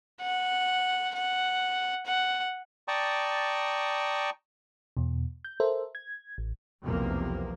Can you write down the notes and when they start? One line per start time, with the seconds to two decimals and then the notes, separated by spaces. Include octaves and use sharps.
0.21 F#5
1.15 F#5
2.06 F#5
2.88 D5 G5 A5 A#5 C#6 D#6
4.97 E2 B2
5.45 G6
5.60 A4 A#4 C5 E5
5.95 G#6
6.38 A1
6.84 F1 B1 E2 C3 F3 A#3